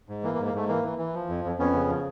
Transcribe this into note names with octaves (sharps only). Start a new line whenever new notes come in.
G#2
E3 A#3
A#3
G#2
A#3
G#2 A3
E3 A#3
E3
E3
F3
F2
F2
F2 B3 C#4
C#3
F3